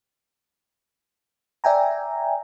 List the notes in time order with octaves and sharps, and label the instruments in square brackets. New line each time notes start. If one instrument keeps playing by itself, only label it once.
[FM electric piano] D5 E5 G5 G#5 A#5